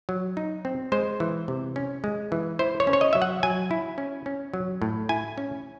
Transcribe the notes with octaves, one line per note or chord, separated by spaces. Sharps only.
F#3
D#4
C4
G#3 C5
E3
C3
C#4
G#3
E3
E4 C5
C#5
C#4
C#5
D#5
F#3 E5
F#5
F#3 G#5
E4
C#4
C#4
F#3
A2
E4 G#5
C#4